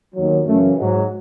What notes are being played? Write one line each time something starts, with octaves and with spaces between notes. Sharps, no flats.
D#2 D#3 F#3
F#2 C#3 E3 A3
G#2 F#3 G#3